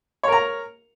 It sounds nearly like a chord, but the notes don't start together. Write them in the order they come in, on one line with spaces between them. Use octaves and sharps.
C#5 A#4 A#5